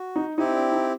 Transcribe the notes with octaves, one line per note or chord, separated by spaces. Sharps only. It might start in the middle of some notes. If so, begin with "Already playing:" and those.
Already playing: F#4
D#4
C4 D#4 E4 G4
D4
D#4